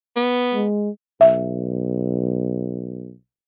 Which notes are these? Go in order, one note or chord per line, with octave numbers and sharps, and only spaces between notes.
B3
G#3
B1 E5